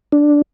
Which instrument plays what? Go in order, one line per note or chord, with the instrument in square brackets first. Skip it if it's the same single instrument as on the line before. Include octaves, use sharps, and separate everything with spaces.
[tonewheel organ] D4